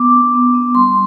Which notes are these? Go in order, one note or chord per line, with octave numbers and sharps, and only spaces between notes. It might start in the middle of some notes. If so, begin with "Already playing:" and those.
Already playing: B3 D6
D4
B3
B3
G3 C6